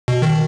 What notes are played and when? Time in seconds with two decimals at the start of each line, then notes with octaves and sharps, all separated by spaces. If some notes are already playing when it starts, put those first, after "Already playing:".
0.08 B2
0.22 D#3